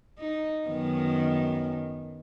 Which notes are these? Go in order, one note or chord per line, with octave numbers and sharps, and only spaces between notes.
D#4
F#2 D#3 B3